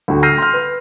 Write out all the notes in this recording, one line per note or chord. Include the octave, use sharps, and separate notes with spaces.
D2 F#4 G5
E6 F6 G6 A#6 C7 D#7
C6 F6
B4